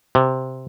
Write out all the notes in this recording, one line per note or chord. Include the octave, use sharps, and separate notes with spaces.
C3